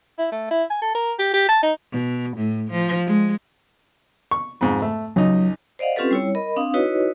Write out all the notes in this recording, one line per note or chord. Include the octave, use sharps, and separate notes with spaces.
E4
A3
E4
G#5
A4
A#4
G4
G4
A5
D#4
B2
A2
F3
G#3
C#6
F2 G#2
A3
C#2 F#3 D#4
C5 D5 D#5 F5 F#5
C4 C#4 F4 G4 A4 B4
G3 E4 C#5
A#4 D#5 B5
C4 D4 F5 D#6
D#4 E4 F#4 B4 C#5 D#5